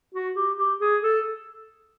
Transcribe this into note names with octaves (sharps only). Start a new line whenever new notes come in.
F#4
G4
G4
G#4
A4